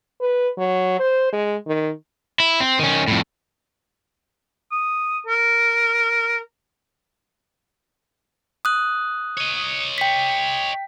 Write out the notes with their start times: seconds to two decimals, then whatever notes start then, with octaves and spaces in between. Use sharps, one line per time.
0.20 B4
0.58 F#3
0.99 C5
1.32 G#3
1.67 D#3
2.40 E4
2.60 C4
2.79 D#3 C#4
3.08 F2 A2
4.72 D#6
5.27 A#4
8.65 D#6 F#6
9.37 C#5 D#5
9.98 G5 B6